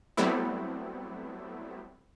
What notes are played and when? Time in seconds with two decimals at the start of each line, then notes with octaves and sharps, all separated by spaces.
0.17 F#3 G3 A3 B3 C4 E4